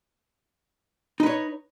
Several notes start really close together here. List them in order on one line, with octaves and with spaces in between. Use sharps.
D#4 B4 C#5